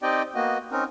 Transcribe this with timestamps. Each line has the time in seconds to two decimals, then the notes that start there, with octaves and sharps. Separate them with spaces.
0.03 C4 D#4 G4 D5 D#5 G5
0.35 A#3 B3 F#4 D#5
0.72 C4 C#4 D#4 A#4